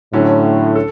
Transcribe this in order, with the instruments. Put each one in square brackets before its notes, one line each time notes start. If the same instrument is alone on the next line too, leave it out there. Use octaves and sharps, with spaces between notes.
[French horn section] A2 [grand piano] D3 F#3 C#4
[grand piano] A4